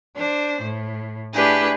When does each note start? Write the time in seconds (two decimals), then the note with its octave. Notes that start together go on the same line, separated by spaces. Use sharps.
0.16 D4 C5
0.64 A2
1.33 A3 D4 E4 G4 G#4 B4